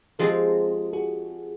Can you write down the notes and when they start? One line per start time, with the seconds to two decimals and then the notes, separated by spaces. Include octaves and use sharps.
0.19 F3 G#3 C4 G4 A4
0.93 F#4 G#4